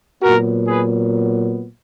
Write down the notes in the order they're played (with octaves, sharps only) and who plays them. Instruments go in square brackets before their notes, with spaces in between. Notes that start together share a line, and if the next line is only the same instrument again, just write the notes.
[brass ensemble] A#2 F#3 B3 F#4 A#4
G#4 B4